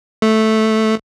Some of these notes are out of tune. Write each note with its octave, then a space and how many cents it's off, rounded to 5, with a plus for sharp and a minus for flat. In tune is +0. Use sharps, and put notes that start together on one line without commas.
A3 -5